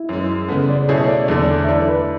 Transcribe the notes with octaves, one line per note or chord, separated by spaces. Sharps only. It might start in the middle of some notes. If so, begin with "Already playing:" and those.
Already playing: E4
F#2 E3 G#3
C#3 G#3 B3 A4
D5
B2 A3 C#4 E4 G#4 C#5
D5
E2 D3 A3 D5
E5
E3 A3 D4 D5
B4